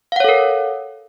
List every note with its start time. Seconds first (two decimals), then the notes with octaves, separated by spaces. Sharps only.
0.12 F5
0.16 F#5
0.20 C#5
0.24 A4
0.29 A#4